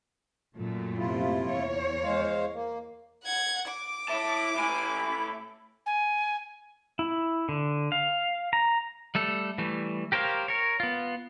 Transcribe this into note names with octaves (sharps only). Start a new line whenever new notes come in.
F#2 A#2 A3
C3 E4 F4
E2 C#5
G#3 C5 F5
A#3
F#5 G#6
D6
E4 A5
A2 E4 G#5 B5
G#5
E4
D3
F5
A#5
G3 A3 A4
E3 G3 A3
G4 A#4 C5 C#5 F5
A#4 C#5
B3 F4